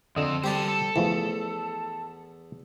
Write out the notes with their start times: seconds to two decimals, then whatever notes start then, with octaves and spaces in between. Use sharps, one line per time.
0.16 F2 D3 C4 D#5
0.44 G3 G4 A4 C5
0.68 A4
0.96 E2 E3 F3 A3